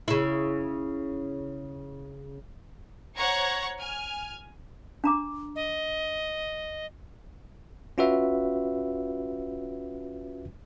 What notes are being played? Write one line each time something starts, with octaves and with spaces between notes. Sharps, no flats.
C#3 E4
C5 C#5 F#5 A#5 C#6 G#6
G#5 F6
D4 A#5 D6
D#5
C#4 F4 F#4 B4 E5